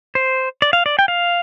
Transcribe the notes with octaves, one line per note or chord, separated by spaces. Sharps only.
C5
D5
F5
D5
G5
F5